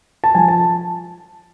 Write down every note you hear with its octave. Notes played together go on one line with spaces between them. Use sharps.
A5
F3 G#5
A5